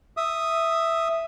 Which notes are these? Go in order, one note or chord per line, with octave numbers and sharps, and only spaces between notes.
E5 D#6